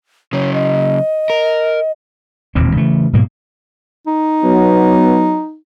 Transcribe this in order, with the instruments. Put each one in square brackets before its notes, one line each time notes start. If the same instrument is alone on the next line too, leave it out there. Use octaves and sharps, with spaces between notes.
[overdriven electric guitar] C#3 F#3 [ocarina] C#5
[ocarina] D#5
[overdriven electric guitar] A#4
[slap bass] E1 D#2 A#2 C4
C#3 E3 A3
G#2 B2 F#3 A#3
[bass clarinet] D#4
[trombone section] F#3 B3